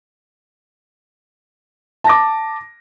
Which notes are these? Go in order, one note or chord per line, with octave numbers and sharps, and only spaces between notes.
A5 D6 A#6